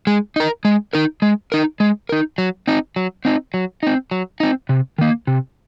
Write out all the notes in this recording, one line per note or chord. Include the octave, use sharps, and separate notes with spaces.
G#3
D#4 A#4
G#3
D#4 A#4
G#3
D#4 A#4
G#3
D#4 A#4
F#3
C4 D#4
F#3
C4 D#4
F#3
C4 D#4
F#3
C4 D#4
C3
D#3 A#3
C3